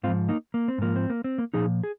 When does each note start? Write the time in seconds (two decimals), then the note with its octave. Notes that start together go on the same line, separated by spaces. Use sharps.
0.03 G#2 C4 F4
0.08 F3
0.29 A#3 D#4
0.54 A#3
0.68 C4
0.78 G#2 F3 A#3
0.96 C4
1.10 A#3
1.24 C4
1.38 A#3
1.54 A#2 F3 D#4 G#4
1.84 G#4